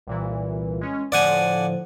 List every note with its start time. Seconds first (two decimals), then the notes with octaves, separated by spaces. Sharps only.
0.07 C2 A#2 E3
0.81 G#3 C#4
1.12 A2 D3 F3 D5 F#5 G#5